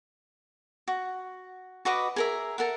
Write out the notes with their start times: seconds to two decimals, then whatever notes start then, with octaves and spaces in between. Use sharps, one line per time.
0.88 F#4
1.85 F#4 B4 D#5 D6
2.16 G#4 A#4 E5
2.58 A4 A#4 E5 F#5